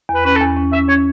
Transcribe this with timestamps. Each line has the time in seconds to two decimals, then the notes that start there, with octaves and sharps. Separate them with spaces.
0.09 E2
0.14 B4
0.25 C#4 B4
0.36 A4
0.41 E2
0.57 C#4
0.72 C#4 E5
0.89 C#4 C#5